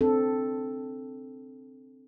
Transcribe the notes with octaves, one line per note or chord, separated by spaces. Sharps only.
C4 D4 A4